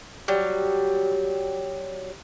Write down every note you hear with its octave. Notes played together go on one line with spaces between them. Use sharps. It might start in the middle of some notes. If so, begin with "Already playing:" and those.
F#3 G3